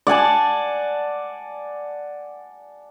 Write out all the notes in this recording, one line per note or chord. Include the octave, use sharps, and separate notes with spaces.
D5 F#5 G#5 A5